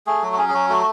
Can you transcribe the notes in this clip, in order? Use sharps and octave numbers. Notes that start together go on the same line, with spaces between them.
A3 G#4
F#3 F#4
F#4
C#4 G#4
G#4
F#3 F#4
A3 F#4